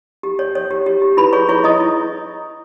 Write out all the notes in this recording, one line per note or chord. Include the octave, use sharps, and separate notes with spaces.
G4
C#5
C#5
G4
G4
G4
E4 B4 B5
G#4 C#5 C#6
E4 C#5 C#6
E4 D#5 D#6
E4